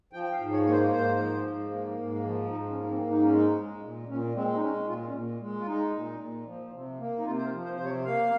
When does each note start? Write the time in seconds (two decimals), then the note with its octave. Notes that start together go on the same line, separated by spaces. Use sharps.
0.13 F3 G5
0.24 G5
0.32 F5
0.39 G#2
0.53 C#5
0.66 A#3 C#5
0.72 C5
0.92 G#2 C5
1.18 F3
1.45 G#2
1.71 A#3
1.98 G#2
2.24 F3
2.50 G#2 D#4
2.70 C#4
2.77 A#3
2.90 C4
3.03 G#2
3.10 D#4
3.22 C#4
3.29 G#3
3.35 D#4
3.56 G#3
3.82 A#2
4.08 A#2 C#4
4.35 G#3 C4
4.56 D#4
4.61 G#3 C#4
4.87 A#2 F4
5.08 C#4
5.14 A#2
5.40 G#3
5.59 F4
5.67 G#3 D#4
5.93 A#2
6.20 A#2
6.46 F3
6.72 C3
6.99 A#3
7.18 D#4
7.25 C3 F4
7.38 C5
7.45 A#4
7.52 F3
7.65 C5
7.76 C3 C5
7.85 C#5
8.05 A#3 F5